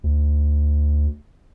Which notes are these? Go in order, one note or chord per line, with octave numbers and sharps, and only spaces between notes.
D2